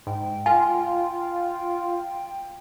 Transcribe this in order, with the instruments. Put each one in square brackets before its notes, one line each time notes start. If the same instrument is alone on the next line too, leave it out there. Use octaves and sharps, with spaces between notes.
[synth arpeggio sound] G#2 [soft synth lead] G5
[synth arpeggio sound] F4 [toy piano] G#5